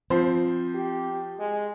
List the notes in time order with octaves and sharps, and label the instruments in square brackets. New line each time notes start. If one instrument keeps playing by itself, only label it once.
[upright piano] F3 C5 [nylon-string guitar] C4
[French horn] G4
G#3